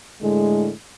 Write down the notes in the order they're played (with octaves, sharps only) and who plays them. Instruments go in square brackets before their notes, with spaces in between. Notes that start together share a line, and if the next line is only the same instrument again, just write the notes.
[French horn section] A2 D3 G#3